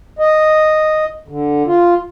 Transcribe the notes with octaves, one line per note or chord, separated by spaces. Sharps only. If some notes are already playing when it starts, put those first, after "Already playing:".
D#5
D3
F4